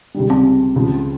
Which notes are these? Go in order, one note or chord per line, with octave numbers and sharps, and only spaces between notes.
C#2 C3 D#3 G3
C4
C#2 C#3 F3